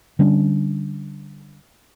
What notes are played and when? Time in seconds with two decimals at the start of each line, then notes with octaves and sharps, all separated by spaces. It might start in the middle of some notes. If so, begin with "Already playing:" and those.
0.19 D3 G3 C#4 D4